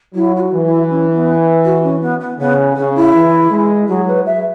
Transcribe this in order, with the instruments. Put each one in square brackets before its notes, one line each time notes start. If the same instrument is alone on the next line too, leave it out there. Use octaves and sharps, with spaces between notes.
[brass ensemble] F#3 [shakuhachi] E4
[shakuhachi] E4
F#4
[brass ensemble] E3
[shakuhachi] E4
C#4
B3
F#4
C#4
B3
B3
[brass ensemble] C#3 [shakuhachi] B3
[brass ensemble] C#3 [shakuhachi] C#4
[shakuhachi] E4
[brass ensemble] E3
G#3
[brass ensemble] F#3 [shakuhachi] G#4
[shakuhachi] B4
E5